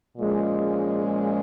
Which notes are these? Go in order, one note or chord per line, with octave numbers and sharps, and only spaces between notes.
A#2 F3 G#3 C#4